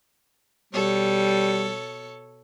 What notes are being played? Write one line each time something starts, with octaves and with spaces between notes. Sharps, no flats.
B2 G3 A4 C#5